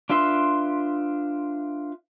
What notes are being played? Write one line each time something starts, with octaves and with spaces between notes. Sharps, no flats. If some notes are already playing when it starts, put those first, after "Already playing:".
D4 F4 B4 E5 C6